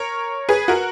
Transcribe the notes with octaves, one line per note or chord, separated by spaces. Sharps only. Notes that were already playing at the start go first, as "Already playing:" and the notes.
Already playing: A#4 C#5
G#4 B4
F#4 A#4